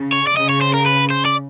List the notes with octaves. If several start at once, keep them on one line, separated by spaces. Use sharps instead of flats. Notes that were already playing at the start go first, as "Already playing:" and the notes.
Already playing: C#3
C#5
D5
C#3 D#5
C#5
C5
A#4
B4
C5
D5